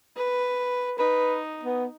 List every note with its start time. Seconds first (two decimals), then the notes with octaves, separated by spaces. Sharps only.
0.16 B4
0.99 D#4 B4
1.63 B3